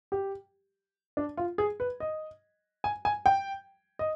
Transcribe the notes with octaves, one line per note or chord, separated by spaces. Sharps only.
G4
D4
F4
G#4
B4
D#5
G#5
G#5
G5
D#5